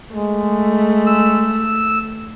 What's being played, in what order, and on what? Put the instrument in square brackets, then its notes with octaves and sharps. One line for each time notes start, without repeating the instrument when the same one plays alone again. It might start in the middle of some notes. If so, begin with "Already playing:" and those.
[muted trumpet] G#3 [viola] A3
[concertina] E6